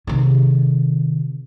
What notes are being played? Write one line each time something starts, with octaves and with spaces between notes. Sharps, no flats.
C3 D#3